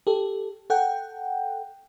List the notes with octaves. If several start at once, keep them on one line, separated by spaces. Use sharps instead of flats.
G4 A4
A4 F#5 G5